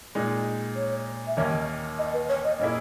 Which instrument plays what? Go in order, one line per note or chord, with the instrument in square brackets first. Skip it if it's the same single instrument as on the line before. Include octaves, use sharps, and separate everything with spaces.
[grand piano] A#2 G#3 D#4
[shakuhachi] C#5
E5
[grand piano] D#2 D#3 A#3 C#4 [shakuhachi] D#5
[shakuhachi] D#5
B4
C#5
D#5
[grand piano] A#2 A#3 C#4 E4 G#4